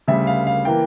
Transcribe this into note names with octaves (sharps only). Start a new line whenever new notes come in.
D2 C#3 G3 E5
F5
F5
E3 A#3 G5